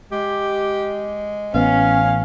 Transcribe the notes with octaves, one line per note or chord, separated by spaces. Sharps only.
G#3 G4
A1 B3 C#4 F5